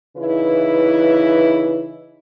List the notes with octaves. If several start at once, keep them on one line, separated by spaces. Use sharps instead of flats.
C#3 E3 D#4 E4 B4